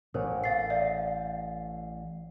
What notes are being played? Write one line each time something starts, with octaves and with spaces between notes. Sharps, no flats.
A1 A2 A#4 C5 C#5
F5 A6 C7
D5 E5 F5